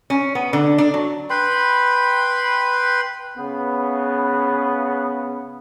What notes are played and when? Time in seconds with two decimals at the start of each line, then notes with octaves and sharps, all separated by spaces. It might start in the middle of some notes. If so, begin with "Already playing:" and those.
0.10 C#4
0.35 B3
0.53 D3
0.78 D4
0.94 F#3
1.30 B4 G5 B5 C6
3.37 C#3 B3